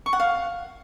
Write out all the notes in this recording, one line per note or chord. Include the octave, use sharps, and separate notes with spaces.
C#6
F#5
F5